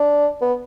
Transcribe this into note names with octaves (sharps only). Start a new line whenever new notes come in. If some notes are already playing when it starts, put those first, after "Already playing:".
Already playing: D4
B3